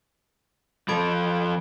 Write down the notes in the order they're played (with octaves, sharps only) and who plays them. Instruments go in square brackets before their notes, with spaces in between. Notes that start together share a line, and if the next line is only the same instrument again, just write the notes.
[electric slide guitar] F3 A4 [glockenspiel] B5 G#6 D7